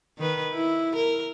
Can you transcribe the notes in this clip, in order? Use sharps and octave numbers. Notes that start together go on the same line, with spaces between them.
D#3 B4
E4
A#4